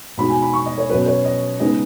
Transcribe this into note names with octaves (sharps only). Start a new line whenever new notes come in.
B2 G#3 D#4 B5
G#5
B5
C#6
D#5
C#5
B2 F#3 C#4 B4
C#5
D#5
C#3 G#3 B3 D#4 D#5